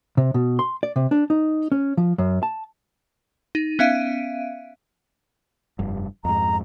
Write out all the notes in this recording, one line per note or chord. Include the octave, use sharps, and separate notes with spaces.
C3
B2
C6
D5
C3
D4
D#4
C#4
F3
F#2
A5
D#4 D#7
B3 C#4 E5 F5 D7 D#7
F1 G2
F2 G#2 A#5